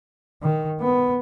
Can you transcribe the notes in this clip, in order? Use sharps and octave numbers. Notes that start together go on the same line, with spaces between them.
D#3
B3